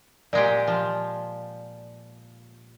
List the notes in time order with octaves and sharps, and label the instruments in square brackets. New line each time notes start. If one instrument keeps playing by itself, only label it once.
[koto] A#2 G#3 G4 [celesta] D5
[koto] F3